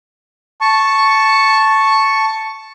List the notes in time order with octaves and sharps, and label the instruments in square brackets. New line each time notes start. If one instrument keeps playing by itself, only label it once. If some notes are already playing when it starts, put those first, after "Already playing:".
[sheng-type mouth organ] A5 C#6